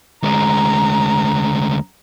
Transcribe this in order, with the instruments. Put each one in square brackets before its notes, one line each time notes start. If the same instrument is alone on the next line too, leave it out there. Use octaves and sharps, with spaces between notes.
[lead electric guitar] D2 G#3 [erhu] A#5